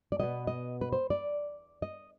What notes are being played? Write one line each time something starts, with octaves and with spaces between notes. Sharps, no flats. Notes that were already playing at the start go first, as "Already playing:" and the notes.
D5
B2 B3 D#5
D#5
B4
C5
D5
D#5